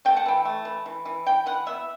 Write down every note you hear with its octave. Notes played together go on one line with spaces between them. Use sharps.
A3 G5
F#5
E3 G5
A3
E3
E3
E3
E3 G5
E3 F#5
B3 E5